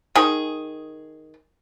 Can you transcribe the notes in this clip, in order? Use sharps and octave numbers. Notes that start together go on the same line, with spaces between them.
D#3 G#4